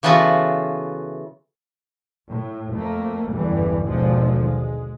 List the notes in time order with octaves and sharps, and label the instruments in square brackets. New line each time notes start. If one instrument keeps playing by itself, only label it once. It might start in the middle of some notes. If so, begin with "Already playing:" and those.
[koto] C#3 E3 B3 F4 F#4 A4
[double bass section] A2
F2 A3 A#3
F#1 E2 G2 D3 E3 G3
G#1 D#2 B2 D3 F3 G#3
G#3